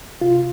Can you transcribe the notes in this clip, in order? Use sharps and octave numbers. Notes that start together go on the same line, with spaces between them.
C3 F4